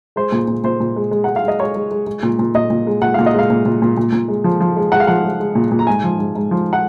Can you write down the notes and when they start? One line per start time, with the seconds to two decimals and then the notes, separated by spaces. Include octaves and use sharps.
0.16 G#3 C5
0.32 A#2
0.48 A#2
0.64 A#2 C5
0.80 A#2
0.96 G#3
1.11 G#3
1.24 G#3 F#5
1.36 F5
1.44 G#3 D#5
1.60 G#3 C#5
1.75 G#3
1.91 G#3
2.06 G#3
2.23 A#2
2.39 A#2
2.54 A#2 D#5
2.70 A#2
2.87 G#3
3.02 A#2 F#5
3.14 A#2 F5
3.26 D#5
3.34 G#3 F5
3.50 A#2
3.65 A#2
3.82 A#2
3.97 A#2
4.12 A#2
4.28 G#3
4.44 F3
4.60 F3
4.77 G#3
4.92 G#3 F#5
5.00 F5
5.07 F3 F#5
5.24 G#3
5.40 G#3
5.55 A#2
5.71 A#2
5.79 A#5
5.87 G#2 G#5
6.04 F3
6.19 G#2
6.35 G#2
6.51 F3
6.73 F#5